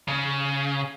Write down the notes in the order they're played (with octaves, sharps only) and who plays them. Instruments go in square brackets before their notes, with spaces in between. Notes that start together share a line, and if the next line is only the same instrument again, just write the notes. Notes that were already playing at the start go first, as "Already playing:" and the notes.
[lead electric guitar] C#3